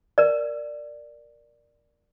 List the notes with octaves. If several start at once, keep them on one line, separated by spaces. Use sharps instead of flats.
A#4 D5